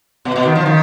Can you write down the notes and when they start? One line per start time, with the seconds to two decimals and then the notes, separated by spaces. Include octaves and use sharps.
0.25 B2
0.36 B2
0.45 D#3
0.55 F3
0.66 D#3